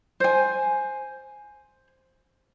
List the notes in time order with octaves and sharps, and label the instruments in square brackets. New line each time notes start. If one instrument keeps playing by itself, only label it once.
[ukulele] C5 G#5